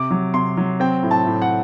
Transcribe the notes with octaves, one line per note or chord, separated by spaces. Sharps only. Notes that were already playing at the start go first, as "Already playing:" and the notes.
Already playing: C3 D6
F#3
C3 C6
F#3
C4 G5
A2
A5
A2
F#5